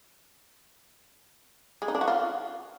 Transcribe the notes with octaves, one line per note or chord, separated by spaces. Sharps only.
G#3
D#4
D4
F#4
F4